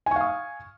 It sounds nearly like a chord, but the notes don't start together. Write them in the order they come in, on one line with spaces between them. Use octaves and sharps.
G#5 C#6 F5 D#6